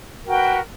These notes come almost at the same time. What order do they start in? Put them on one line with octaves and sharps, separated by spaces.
A#4 F#4 G5 B4